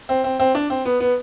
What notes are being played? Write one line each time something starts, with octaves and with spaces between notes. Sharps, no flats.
C4
C4
C4
D4
C4
B3
B3